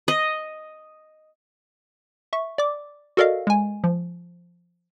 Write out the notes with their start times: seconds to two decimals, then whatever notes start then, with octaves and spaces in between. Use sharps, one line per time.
0.08 D#5
2.33 E5 C#6
2.58 D5 D6
3.17 F#4 A4 A#4 D5 D#5 F5
3.47 G#3 G#5
3.84 F3